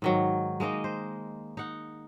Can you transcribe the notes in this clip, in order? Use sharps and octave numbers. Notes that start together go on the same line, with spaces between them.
G#2 D#3 F#3
G#3 A#3 D#4 D#5
C5
D#4 F#5